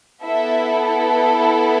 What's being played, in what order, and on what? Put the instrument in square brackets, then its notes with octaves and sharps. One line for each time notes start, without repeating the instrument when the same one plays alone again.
[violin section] B3 E4 A4 E5